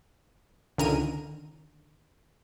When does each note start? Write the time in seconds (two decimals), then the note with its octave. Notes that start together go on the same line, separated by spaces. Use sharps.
0.78 C#2 D3 D#3 A#4 D#7